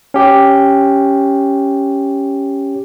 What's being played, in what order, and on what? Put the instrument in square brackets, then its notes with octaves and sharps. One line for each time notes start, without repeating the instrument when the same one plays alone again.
[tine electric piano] C#4 G4